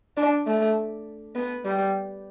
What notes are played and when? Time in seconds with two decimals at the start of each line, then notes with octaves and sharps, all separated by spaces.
0.17 D4
0.46 A3
1.35 B3
1.65 G3